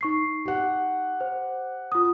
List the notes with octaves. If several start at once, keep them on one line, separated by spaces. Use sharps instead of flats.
D#4 C#6 C7
G4 F#5
C5
F4 D#6